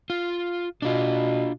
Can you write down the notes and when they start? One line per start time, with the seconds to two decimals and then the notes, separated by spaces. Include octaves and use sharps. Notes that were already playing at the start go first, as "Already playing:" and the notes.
0.10 F4
0.82 B2 D4 F4